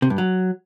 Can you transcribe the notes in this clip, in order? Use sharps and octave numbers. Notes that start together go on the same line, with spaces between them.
C3
G2
F#3